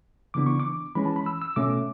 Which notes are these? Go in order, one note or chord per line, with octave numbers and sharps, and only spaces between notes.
C#3 E3 B3 D4 D6
C#6
D6
E3 G#3 C#4 B5
A5
B5
E6
E6
B2 A3 C#4 D6